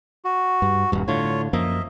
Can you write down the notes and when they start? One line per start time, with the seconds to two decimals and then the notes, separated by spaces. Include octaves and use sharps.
0.25 F#4
0.62 G2
0.92 D#1 G2
1.08 A2 D3 F4 C#5
1.53 F#2 F3 A#3 D#5 E5